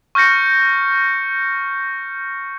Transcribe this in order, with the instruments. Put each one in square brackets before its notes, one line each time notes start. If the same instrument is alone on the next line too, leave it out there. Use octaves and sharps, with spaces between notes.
[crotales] C#6 F6 G6 A#6 C#7